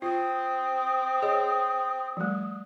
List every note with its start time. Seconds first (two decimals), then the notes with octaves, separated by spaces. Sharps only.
0.02 C4 F4 D#6
1.22 G#4 C#5 D#5
2.17 F3 G3 A3